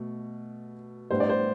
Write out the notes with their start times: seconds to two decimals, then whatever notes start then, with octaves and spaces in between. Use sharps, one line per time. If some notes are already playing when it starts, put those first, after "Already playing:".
Already playing: B2 A3
1.10 A2 G3 B3 D4 C5
1.20 D5
1.29 C5